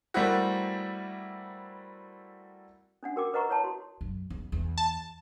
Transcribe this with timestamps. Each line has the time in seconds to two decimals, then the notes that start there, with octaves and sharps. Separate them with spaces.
0.14 G3 A3 A#3 C4 E4 F#4
3.03 C#4 D4 F#5
3.16 F#4 A#4 G5 D6
3.33 A#4 B4 D#5 F#5 A#5 C#6
3.49 E4 C#5 A5
3.64 F#4 C6
4.01 F#2
4.30 E2
4.52 E2
4.78 A5